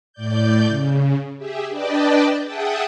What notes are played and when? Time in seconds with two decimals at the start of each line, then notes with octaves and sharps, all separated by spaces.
0.13 A2 D5 G6
0.68 C#3
1.38 G4 G#4 E5
1.70 D4 B4 D5 D#5 G5 A5
2.44 G#4 E5 F#5 G5 A5 D#6